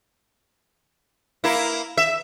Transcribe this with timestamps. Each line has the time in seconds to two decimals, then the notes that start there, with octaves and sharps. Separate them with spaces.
1.44 A#3 E4
1.97 E5